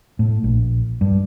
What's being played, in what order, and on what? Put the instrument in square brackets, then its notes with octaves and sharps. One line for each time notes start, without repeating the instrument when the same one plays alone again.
[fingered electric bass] A2
A#1
G2